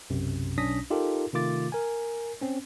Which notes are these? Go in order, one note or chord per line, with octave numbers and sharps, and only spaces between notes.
B1 F#2 C3
B1 C#4 D4 D#6 A#6 B6
D#4 F4 G4 A4 A#4
C3 D#3 A3 F4 D6 A6
A#4 G#5
C4 C#4